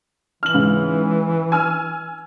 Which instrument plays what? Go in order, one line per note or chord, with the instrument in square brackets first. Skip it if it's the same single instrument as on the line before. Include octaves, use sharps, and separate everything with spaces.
[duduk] E3 [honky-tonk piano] F6 F#7
[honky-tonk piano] G#2 C#3
G#5 E6 F6